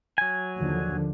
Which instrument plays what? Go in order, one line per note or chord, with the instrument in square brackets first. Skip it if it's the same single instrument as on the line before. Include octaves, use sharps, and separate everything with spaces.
[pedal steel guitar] F#3 G#5
[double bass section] D#2 D3 F3